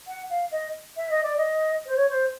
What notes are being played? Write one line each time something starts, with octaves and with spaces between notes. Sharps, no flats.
F#5
F5
D#5
E5
D#5
D5
D#5
C5
C#5
C5